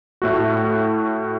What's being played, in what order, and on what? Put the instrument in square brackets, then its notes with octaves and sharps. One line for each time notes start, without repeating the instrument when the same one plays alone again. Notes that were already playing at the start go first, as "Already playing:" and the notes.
[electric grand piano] A2 A3 F#4